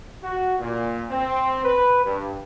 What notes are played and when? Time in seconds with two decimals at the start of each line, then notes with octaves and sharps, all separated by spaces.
0.23 F#4
0.59 A#2
1.10 C4
1.64 B4
2.05 G2